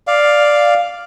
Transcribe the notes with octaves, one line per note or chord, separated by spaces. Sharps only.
D5 F5